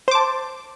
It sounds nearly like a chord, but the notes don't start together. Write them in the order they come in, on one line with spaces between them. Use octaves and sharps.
C5 D6 A5